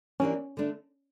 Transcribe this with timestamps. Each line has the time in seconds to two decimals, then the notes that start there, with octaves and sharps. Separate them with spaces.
0.20 E3 A#3 C#4 D4 G4 D5
0.57 D3 A3 D4